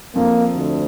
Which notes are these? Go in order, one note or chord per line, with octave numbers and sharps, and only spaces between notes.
F2 A#3
D2